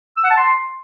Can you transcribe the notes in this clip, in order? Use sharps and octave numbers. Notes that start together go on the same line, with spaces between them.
E6
F#5
A5
C6